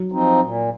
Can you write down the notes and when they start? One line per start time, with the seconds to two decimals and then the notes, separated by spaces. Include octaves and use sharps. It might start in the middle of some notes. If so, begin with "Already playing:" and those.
Already playing: F#3
0.12 F3 C4 D#4
0.41 A#2